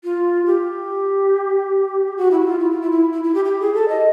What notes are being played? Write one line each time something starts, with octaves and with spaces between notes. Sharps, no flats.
F4
G4
F#4
E4
E4
F4
E4
F4
E4
E4
E4
E4
G4
G4
G#4
A4
D#5